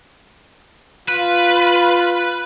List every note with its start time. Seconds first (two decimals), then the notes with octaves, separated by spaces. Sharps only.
1.08 F4 B4